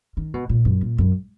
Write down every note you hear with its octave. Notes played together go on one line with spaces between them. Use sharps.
D#3
B2
A#2
F#2
A#2
F#2